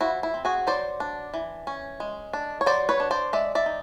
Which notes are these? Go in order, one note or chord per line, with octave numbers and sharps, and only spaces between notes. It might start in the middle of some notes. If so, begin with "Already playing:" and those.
F3 E4 F#4
E4
C4
F#4 G#4
F#3 C5 D5
D4
E3
C#4
G#3
D4
C#5
F#3 C5 D5
B4 C#5
D4
C5 D5
G#3 D5 E5
D5 E5
D#4